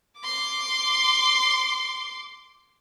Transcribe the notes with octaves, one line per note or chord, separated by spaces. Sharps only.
C6 D6